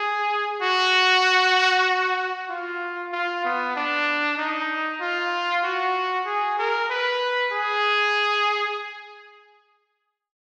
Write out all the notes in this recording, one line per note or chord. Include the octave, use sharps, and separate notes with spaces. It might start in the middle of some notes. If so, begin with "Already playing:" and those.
Already playing: G#4
F#4
F4
F4
B3
D4
D#4
F4
F#4
G#4
A#4
B4
G#4